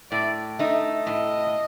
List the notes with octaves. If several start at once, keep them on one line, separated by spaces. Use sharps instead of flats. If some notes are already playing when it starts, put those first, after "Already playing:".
A2 D5
A3 D#4 D#5
A2 D#5